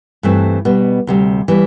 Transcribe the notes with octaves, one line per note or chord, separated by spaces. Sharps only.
G2 E3 A3 C4
B2 G3 B3
D2 C3 G3
E3 G3 B3